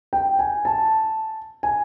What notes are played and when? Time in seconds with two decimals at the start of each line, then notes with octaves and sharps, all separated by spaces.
0.13 G5
0.39 G#5
0.65 A5
1.63 G#5